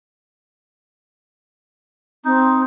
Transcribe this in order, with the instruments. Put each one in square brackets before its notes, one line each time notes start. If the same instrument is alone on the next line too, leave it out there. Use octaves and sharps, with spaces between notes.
[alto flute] C4 [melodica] D#4